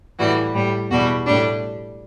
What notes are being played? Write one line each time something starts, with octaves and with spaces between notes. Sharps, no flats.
A2 E3 G3 F#4
A2 G3
E2 B2 G3 F#4
A2 G3 D4